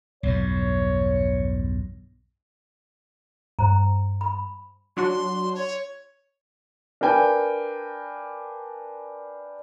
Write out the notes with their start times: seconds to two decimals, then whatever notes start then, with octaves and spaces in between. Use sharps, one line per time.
0.23 B1 E2 G2 C#5
3.59 G2 C5 A#5
4.21 B5
4.97 F#3 D4 F#4 C6
5.55 C#5
7.01 D4 A#4 B4 G5 G#5